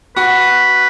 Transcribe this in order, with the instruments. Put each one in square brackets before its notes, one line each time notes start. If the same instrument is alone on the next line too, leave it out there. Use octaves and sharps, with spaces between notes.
[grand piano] F#4 [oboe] B4